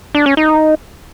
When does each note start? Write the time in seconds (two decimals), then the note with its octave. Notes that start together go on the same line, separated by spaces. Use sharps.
0.15 D4
0.26 C#4
0.37 D#4